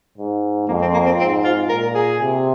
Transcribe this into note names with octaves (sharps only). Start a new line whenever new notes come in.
G#2
F2 A#3
C4
A#3
C4
G#2 C4
F4
A#2 A#4
G#4
C3